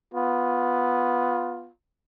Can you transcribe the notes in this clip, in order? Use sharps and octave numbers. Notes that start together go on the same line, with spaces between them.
B3 F4